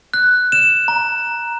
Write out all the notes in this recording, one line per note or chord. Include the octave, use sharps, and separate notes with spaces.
F#6
E7
A#5